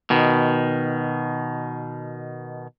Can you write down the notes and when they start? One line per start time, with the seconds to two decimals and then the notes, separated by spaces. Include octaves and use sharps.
0.10 B2 D#3